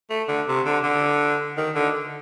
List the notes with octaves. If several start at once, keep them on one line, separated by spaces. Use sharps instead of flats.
A3
D3
C3
D3
D3
D#3
D3